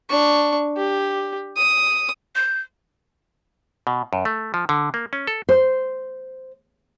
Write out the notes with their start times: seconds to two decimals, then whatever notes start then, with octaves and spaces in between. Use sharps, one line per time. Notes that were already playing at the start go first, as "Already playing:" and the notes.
0.10 D4 C#6
0.77 G4
1.56 D#6
2.36 G6
3.87 B2
4.13 F#2
4.25 A3
4.54 F3
4.69 D3
4.94 A#3
5.13 C#4
5.27 A4
5.49 C5